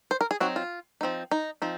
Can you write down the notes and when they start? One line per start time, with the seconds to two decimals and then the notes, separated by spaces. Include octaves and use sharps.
0.11 C5
0.21 A#4
0.31 G#4
0.40 F#3 C4 D#4 F#4
0.56 F4
1.01 F3 C4 D#4
1.31 D#4
1.62 F3 C4 D#4